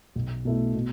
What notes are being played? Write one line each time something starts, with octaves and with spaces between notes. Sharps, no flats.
B1
B2 A3 E4
B2